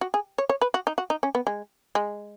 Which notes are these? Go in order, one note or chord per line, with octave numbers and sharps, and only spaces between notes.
F#4
G#4
C#5
C#5
B4
F#4
D#4
F#4
D#4
C#4
B3
G#3
G#3